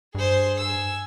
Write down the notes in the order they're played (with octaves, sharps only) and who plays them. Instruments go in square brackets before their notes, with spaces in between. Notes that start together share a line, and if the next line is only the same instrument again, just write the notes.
[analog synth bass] G2 [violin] G#4 C5
[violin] G#5 E6